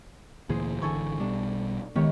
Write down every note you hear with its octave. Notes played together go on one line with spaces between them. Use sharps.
D2 A#2 E3 G#4 C5
G#1 D3 E3 A4 G#5 C#6
B1 B2 G3 D4
C#2 D#3 G#3 B3 G4 C#5